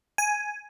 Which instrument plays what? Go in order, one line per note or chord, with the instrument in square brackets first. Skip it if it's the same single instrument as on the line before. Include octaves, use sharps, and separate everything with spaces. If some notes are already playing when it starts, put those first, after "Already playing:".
[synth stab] G#5